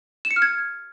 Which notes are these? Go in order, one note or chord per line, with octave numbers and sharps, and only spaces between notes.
E7
C#7
F6
G#6